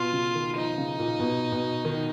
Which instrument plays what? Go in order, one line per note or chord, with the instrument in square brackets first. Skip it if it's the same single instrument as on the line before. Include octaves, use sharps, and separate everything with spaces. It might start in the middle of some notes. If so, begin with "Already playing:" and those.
Already playing: [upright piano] B2 [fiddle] F4
[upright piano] C#3
D#3
[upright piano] F3 [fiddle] D#4
[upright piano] C#3
A#2
B2
B2
D#3